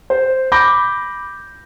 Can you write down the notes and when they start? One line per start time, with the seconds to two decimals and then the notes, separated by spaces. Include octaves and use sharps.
0.10 C5
0.52 B5 D6 G6 A#6